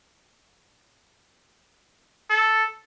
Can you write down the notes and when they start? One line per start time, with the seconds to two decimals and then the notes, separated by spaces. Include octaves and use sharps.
2.30 A4